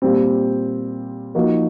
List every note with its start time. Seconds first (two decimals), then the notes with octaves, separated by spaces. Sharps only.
0.02 A#2 G3 C4
1.35 F3 A#3 D#4 F#4